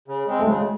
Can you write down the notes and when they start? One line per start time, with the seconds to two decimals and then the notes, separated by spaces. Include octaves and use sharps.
0.08 C#3
0.27 G#3 C4
0.39 A3
0.47 C#3 G#3